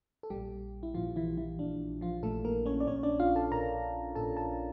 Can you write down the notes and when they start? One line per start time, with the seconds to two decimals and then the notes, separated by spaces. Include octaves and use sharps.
0.23 A4
0.30 A#1 A#2 G3 G4
0.83 E4
0.94 A#1 A#2 F3 F4
1.16 E3 E4
1.37 E3 E4
1.59 A#1 A#2 D4
2.01 F3 F4
2.23 A#1 A#2 A3 A4
2.45 A#3 A#4
2.66 C#4 C#5
2.80 D5
2.87 A#1 A#2 C#4 C#5
3.03 D4 D5
3.20 F4 F5
3.35 A4 A5
3.51 A#1 A#2 A#4 A#5
4.15 A#1 A#2 A4 A5
4.37 A4 A5